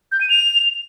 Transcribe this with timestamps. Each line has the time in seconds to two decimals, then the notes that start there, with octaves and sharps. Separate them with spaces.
0.12 G6
0.21 D#7
0.30 F7